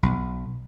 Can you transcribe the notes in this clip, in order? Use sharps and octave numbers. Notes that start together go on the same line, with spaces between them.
B1